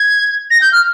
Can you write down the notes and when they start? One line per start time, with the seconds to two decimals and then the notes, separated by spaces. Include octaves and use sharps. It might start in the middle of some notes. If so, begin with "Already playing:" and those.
Already playing: G#6
0.51 A#6
0.61 G6
0.72 F6